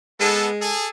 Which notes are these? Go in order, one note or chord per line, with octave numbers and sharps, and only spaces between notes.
G#3 B3 A4
G#4 A4